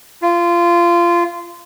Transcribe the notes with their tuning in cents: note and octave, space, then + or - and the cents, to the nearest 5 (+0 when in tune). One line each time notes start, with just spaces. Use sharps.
F4 -20